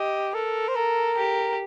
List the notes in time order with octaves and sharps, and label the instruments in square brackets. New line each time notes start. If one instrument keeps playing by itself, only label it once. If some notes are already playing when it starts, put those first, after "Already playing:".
Already playing: [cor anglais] G4 [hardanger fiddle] D#5
[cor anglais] A4 [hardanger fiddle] A#4
[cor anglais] C5
[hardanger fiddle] A4 [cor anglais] A#4
[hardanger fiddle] G4